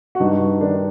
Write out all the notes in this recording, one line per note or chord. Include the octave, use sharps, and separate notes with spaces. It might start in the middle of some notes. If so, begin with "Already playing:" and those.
F#4
G2 D#4
D#3 D4